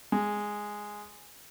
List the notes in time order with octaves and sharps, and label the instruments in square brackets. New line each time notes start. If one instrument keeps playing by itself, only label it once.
[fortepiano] G#3